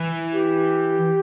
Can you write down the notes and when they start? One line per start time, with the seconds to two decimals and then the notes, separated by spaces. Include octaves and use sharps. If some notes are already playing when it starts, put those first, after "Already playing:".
Already playing: E3
0.33 G4